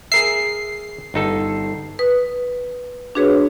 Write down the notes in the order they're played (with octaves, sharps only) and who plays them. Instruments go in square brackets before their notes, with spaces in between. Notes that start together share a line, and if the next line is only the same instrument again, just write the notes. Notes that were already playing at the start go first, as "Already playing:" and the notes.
[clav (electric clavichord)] G#4 A#4 E5 [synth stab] C7
[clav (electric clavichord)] G1 D#4 A4
[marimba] B4 D#6
D4 F#4 G#4 B4 C#5